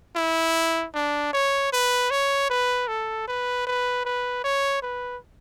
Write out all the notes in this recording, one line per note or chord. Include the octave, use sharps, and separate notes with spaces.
E4
D4
C#5
B4
C#5
B4
A4
B4
B4
B4
C#5
B4